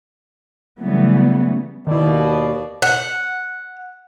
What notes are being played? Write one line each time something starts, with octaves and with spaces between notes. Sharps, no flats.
C#3 E3 F#3 G3 A3 B3
D#2 B2 D#3 E4 D5
F#5